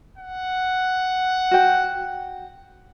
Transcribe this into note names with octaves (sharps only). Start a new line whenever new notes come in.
F#5
F#4 G5